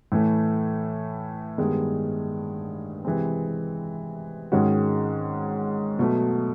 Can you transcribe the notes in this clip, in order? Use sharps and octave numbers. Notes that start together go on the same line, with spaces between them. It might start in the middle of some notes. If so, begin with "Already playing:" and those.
A2 E3 A3
G2 D#3 G#3 B3
C3 E3 G#3 C4
G#2 D#3 G#3 C#4 F#4
B2 F#3 A3